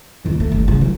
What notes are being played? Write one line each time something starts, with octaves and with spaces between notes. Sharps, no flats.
D#2 F3
A3
G1 G#2
C#3
F#3